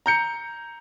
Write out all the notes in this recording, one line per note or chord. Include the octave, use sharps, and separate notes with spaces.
A#5 G6 C#7